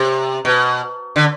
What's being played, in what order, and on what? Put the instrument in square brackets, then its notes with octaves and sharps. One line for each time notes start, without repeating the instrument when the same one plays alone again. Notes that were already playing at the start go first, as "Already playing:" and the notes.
Already playing: [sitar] C3
B2
D3